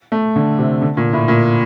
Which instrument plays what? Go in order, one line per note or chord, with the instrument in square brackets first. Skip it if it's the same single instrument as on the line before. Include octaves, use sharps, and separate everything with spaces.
[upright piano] A3
D3
C3
D3
A#2
A2
A#2